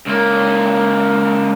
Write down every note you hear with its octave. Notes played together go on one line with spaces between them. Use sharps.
C#2 A#3